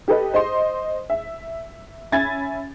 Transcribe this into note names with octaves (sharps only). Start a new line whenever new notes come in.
G4 A4 B4 D#5
C5 D#5 C6
E5
C#4 E5 G#5 B5 G#6 A6